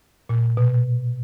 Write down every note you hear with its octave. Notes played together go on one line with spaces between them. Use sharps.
A#2
B2